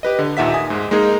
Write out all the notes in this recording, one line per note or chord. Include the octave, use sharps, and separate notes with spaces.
G4 B4 D#5
D3
D#2 A#2 D#4 E5 F#5 B6
G#5 D#6
G#2 G#3
G#3 A#3 D#4 G#4 A#4